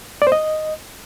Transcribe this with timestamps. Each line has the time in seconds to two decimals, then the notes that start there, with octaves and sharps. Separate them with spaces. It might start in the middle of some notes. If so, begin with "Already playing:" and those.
0.22 D5
0.27 C5
0.32 D#5